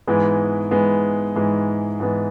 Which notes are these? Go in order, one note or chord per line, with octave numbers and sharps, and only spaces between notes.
G#2 E3 G#3 B3
G#2 E3 G#3 B3
G#2 E3 G#3 B3
G#2 E3 G#3 B3